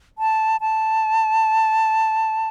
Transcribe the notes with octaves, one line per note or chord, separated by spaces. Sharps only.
A5
A5